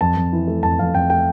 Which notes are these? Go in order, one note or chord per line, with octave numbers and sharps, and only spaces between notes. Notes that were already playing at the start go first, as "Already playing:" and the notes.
F2 A5
F2
E3
A3
F2 A5
F2 F5
F2 G5
A3 G5